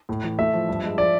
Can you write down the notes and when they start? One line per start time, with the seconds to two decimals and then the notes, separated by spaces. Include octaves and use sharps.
0.09 A2
0.24 E3
0.39 A3 E5
0.53 F3
0.69 G2
0.84 G#3
0.98 F3 D5